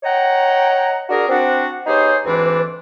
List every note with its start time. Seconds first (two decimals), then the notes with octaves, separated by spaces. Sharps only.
0.03 C#5 D#5 F#5 G5 A#5
1.10 D4 F#4 G#4 A#4
1.29 C4 D4 F#4
1.86 B3 D#4 G4 G#4 C5 C#5
2.25 D2 G#2 E3 C4 D4 B4